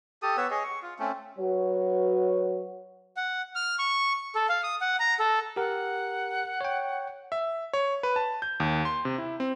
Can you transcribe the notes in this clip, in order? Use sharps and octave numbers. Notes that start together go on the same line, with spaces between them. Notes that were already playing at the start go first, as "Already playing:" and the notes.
G4 A4 D#6
B3 B4 C#5 E6
G#4 C#5 D#5
C#6
F4
A3 C4 C#4
F#3 F#4 B4 C#5
F#5
F6
C#6
A4
F5
D#6
F#5
A#5
A4
G4 A#4 F#5
C#5 G5
E5
C#5
B4
A5
G6
D#2
C6
C3
E4
C4